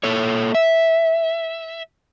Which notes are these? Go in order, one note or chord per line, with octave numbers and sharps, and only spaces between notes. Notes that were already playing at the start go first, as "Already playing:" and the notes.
A#3 A4 C#5
E5